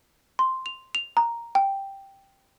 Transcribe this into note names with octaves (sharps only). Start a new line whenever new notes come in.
C6
F7
F7
A#5
G5